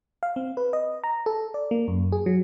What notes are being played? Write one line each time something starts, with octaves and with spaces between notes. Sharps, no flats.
F5
C4
B4
D#5
A#5
A4
D5
A#3
F#2
G#4
F#3